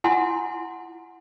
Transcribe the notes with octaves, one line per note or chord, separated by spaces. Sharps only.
E4 F#5 G#5 C6